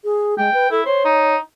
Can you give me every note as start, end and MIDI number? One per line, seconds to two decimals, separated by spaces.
0.04 0.35 68
0.38 0.52 56
0.38 0.70 79
0.54 0.67 71
0.71 0.82 64
0.71 0.84 69
0.86 1.00 72
0.86 1.35 73
1.05 1.37 63